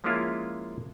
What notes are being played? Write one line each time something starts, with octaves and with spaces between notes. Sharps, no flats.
F3 G#3 A#3 C#4 E4 F4